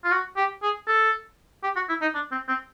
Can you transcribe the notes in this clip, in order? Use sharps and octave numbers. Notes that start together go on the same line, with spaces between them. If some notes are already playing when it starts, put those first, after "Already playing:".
F4
F#4
G4
G#4
A4
G4
F#4
E4
D#4
D4
C4
C4